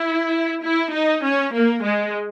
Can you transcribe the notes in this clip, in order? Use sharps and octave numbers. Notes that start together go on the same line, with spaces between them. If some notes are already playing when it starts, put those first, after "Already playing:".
Already playing: E4
E4
D#4
C#4
A#3
G#3